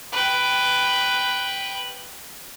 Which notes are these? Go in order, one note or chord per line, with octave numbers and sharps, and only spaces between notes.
B4 G5